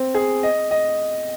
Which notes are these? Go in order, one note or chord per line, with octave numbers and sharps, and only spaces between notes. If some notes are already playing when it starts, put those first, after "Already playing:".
Already playing: C4
G#4
D#5
D#5